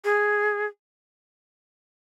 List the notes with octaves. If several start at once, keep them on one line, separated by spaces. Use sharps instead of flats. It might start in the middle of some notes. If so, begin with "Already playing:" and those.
G#4